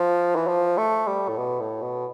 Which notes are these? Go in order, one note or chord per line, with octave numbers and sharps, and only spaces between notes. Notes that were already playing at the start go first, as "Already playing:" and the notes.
Already playing: F3
E3
F3
A3
G3
A2
B2
A2
B2